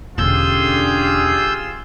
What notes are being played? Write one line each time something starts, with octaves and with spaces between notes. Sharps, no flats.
E1 D3 C#4 F4 G4 G#4 E6 G6